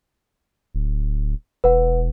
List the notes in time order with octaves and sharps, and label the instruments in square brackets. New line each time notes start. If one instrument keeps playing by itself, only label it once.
[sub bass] D1
[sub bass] E1 [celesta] B4 F#5